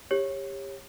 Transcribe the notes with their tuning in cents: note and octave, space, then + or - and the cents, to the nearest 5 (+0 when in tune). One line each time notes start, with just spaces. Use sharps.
G4 +20 C#5 -20